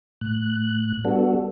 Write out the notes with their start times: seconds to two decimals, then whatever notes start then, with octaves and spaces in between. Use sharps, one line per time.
0.21 A2 F#6
1.05 G3 B3 D4 F#4 A4